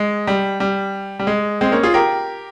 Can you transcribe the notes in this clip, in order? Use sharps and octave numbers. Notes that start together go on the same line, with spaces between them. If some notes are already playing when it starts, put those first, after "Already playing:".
Already playing: G#3
G3
G3
G3
G#3
G#3 C4
A#3 C#4
F4 G#4
G4 A#4